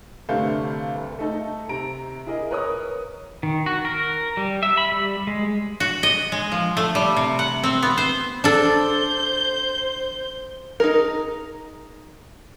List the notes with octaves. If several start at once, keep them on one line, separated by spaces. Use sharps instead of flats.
G1 C3 A3 D4 F5 G6
C2
A3 D#4 A4
C3 A#5 D7
E4 G#4 A#4 D#5
A#4 B4 C#5 A#5 D#6
D#3
F#4
A#4
G3
E5
B5
G3
G#3
F#4
D#5
G#3
F3
A3
G3
C3
F#5
C4
B3
C5
D4 A4 C5 G6
D#4 G#4 A#4